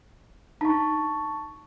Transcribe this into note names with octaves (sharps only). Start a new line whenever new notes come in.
D4 D#4 A5 C#6